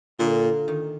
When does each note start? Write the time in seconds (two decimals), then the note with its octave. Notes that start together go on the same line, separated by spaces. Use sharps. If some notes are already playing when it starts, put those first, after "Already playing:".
0.19 A#2 D3
0.68 D#3